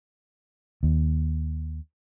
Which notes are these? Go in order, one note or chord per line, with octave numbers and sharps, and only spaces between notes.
D#2